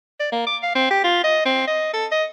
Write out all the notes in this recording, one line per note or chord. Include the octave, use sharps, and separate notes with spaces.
D5
A#3
D6
F5
C4
G4
F4
D#5
C4
D#5
A4
D#5